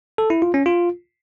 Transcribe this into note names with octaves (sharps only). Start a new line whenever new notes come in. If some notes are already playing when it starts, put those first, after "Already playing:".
A4
E4
F4
C#4
F4